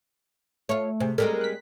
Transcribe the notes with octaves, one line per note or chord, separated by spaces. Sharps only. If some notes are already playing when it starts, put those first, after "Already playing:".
A3 F4 C#5
C3 G#4 C5
G3 G#3 C4 A4 A#4
F#6 B6